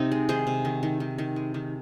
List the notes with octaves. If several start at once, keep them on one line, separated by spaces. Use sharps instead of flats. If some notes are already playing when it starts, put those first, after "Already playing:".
Already playing: C3 C4 D#4
G#3
D#3 G#4 C5
C3
D#3
D#3
D#3
D#3
G#3
D#3